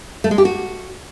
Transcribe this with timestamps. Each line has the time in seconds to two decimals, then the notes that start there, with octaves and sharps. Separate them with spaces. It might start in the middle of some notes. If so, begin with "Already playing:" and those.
0.24 A3
0.31 G#3
0.38 G4
0.45 F#4